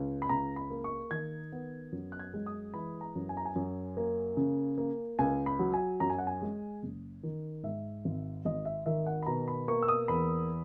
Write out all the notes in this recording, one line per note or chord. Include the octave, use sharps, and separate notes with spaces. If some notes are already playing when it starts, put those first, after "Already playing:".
Already playing: C#2
B5
C#2 A#5
B5
A#3
C#6
D#3 G#6
B3
F#2
F#6
G#6
G#3
D#6
E3 B5
A#5
F#2
G#5
A#5
G#5
F#2
A#3
C#3
A#3
C#2 G#5
B5
F#3
G#5
F#2 A#5
G#5
F#5
G#5
G#3
F#1
D#3
G#2 E5
G#1
G#1 D#5
E5
D#3 E5
F#5
B5
B2 A#5
B5
A#3 C#6
E6
D#6
E2 B5